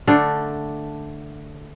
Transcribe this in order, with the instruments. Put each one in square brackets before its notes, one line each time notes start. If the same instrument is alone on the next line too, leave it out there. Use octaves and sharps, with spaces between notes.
[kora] D3 A3 D4